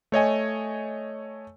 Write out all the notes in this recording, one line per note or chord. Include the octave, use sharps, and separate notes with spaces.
A3 C#5 D#5 G#5